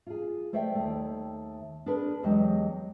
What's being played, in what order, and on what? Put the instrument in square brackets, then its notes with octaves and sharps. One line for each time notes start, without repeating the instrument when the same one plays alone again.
[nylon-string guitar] F4 G#4
A3 C5 D5 E5 G5
D#2 A3
D4 G#4 A#4 B4
E2 F#3 G#3 G4 D#5